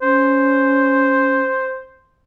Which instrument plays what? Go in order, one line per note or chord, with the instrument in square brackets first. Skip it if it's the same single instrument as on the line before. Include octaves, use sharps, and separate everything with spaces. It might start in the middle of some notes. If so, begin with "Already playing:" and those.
[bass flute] C#4 [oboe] C5